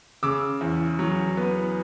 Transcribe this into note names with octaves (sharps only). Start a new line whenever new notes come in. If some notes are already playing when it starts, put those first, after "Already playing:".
C#3 D6 E6
E2
F#3
B3